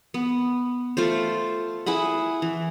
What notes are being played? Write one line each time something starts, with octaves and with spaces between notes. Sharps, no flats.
B3
A3 F4 C5
E4 G#4 B4 F#5
E3